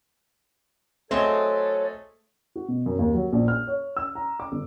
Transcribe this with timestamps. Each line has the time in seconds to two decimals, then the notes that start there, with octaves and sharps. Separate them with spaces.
1.11 F#3 A3 C4 G#4 A4 C5 C#5 D#5
2.56 F#4
2.68 B2
2.86 F#2
2.99 D#2
3.14 F#3
3.33 A#1
3.48 F6
3.67 C#5
3.97 E6
4.15 A#5
4.40 D6
4.52 G1